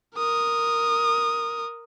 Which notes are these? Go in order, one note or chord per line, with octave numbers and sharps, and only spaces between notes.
A#4 D#6